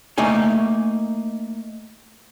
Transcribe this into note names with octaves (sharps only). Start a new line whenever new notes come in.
A3 A#3 D#4 G#5